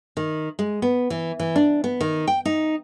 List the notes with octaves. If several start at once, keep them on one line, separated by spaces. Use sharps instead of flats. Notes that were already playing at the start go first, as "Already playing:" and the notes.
D#3
G#3
B3
E3
E3
D4
B3
D#3
G5
D#4